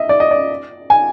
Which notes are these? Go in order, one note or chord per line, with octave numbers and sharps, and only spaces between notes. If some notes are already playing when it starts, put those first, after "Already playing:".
Already playing: D#5 E5
D5
D#5
D5
G#5